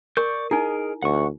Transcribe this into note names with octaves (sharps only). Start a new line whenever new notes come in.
A#4 D5 C#6 G6
D#4 E4 G#4 A#4 D#5
D2 F#5 C#6